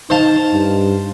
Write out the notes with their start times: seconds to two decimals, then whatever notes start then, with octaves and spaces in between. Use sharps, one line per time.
0.10 D#4 C5 F5 A5
0.53 G2